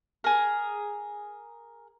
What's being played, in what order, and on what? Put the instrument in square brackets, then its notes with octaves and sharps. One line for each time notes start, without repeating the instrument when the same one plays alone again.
[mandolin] G#4 A#4